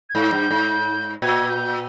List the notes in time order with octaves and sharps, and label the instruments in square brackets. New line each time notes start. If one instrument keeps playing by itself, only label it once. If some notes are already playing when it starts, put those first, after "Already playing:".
[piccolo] G#6
[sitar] G#2 [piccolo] G6
[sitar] G2
G#2
[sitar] A#2 [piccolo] G#6
[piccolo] G6